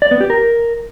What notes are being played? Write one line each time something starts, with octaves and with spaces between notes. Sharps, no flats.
D5
B3
G4
A#4